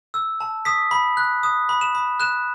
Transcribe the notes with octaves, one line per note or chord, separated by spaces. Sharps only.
E6
A5
D#6 B6
B5
F#6
D#6
B5
E7
B5
F#6 E7